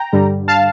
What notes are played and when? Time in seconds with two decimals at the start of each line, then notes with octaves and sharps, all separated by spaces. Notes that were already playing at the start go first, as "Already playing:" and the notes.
Already playing: G5 A#5
0.13 G2 D3 G3
0.48 F5 A5